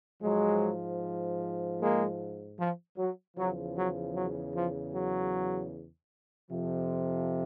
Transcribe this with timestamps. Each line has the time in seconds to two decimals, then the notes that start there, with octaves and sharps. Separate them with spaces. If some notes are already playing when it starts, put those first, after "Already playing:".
0.22 G#2 F3 F#3 G#3
1.80 G#3 A#3
2.58 F3
2.97 F#3
3.36 E2 C#3 F3 F#3
3.76 F#3
4.15 F#3
4.55 F3
4.94 F#3
6.50 F2 C3 F3